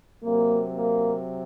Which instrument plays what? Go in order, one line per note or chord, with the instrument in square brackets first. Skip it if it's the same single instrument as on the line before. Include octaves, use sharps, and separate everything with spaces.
[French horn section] C3 F#3 A#3
A#3